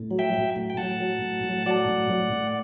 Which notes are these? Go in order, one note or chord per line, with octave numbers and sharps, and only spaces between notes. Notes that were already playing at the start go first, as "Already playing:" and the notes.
Already playing: A2
F#3
E5 G5
F#3
A2
G5
A2 F#5 A5
F#3
A2
A2
F#3 D5 F#5
A2
A2
A2